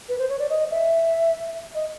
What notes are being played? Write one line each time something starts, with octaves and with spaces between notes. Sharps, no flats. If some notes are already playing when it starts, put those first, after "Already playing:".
B4
C5
C#5
D5
D#5
E5
D#5